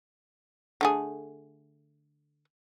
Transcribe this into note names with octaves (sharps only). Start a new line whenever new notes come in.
D3 A3 G#4